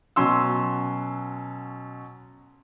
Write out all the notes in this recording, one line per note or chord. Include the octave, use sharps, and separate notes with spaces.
B2 F#3 C#4 C6 E6